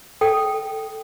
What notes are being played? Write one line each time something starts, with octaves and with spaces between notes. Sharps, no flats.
A4 G5